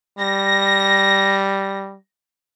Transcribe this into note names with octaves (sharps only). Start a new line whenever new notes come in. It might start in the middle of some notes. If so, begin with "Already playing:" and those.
G3 A#6